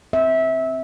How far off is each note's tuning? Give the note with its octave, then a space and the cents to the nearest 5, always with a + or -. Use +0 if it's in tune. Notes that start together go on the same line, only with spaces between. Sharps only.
C4 +0 E5 -20